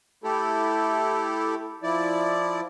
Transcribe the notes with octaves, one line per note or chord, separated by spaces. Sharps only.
A3 E4 G4 A4
F3 E4 D5